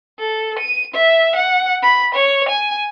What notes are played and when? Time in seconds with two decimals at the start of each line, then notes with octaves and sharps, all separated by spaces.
0.19 A4
0.59 D#7
0.94 E5
1.35 F#5
1.83 B5
2.15 C#5
2.49 G#5